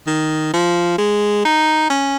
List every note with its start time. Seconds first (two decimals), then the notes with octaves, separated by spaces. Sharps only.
0.07 D#3
0.53 F3
0.98 G#3
1.45 D#4
1.90 C#4